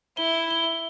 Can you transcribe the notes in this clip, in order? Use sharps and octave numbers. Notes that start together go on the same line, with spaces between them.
E4 G7
G7